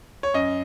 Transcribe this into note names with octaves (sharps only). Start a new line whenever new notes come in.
C#5
F#2 D#5